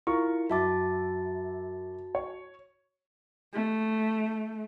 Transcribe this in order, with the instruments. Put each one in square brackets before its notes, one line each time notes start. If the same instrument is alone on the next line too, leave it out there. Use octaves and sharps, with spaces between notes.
[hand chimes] E4 [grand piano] F4 A#4 C#6
[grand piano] F#2 E5 D6 [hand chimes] F#4 A5 A6
[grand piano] C#5
[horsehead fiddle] A3